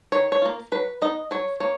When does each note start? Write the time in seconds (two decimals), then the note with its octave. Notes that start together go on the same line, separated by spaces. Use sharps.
0.12 D#3 C#5
0.32 C#5
0.42 A#3 F4
0.72 F#3 B4
1.02 B3 D#4 D#5
1.31 F#3 C#5
1.60 A#3 C#5